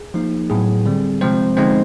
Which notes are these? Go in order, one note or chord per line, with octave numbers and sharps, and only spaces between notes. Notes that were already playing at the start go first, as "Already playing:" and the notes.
Already playing: G#4
F3 A#3 D#4
A2 F#3 B3 G#4
D3 G3 C4
C3 F3 G#3 C4 C5
D3 F3 G#3 B3 C4 D#4 C5